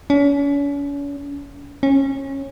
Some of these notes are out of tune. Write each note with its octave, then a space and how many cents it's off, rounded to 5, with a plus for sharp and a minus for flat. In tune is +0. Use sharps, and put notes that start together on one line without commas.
C#4 +40
C#4 -20